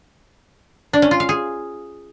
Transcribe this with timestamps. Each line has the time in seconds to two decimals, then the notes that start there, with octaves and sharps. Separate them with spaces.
0.93 D4
1.02 C#4
1.11 F4
1.20 F5
1.29 G#4